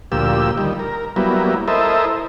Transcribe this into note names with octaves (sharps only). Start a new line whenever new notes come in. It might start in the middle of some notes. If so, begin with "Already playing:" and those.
D2 A#2 F3 G4 E6
D#3 G3
A#4
F#3 G3 A#3 B3 E4
E4 A4 A#4 C5 D#5 E5